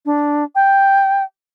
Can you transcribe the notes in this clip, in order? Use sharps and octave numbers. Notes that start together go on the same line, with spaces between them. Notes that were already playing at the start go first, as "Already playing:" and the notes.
D4
G5